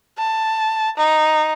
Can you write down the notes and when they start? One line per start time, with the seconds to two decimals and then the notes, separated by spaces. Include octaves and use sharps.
0.18 A5
0.97 D#4